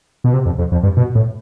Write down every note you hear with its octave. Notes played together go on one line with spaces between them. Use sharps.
B2
C3
F2
F2
F2
G2
B2
A2